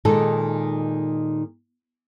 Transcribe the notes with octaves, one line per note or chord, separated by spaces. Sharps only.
A#2 D#3 G#3 D#4 A4